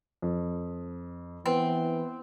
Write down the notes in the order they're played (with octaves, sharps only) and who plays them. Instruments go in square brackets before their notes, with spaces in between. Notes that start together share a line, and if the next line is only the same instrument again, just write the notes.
[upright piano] F2
[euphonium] E3 [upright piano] B3 [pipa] C4